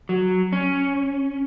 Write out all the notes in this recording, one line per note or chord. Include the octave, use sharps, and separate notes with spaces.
F#3
C#4